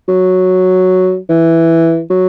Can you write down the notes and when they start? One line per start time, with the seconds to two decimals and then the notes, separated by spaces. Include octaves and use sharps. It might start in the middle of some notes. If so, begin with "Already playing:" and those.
0.08 F#3
1.29 E3
2.10 F#3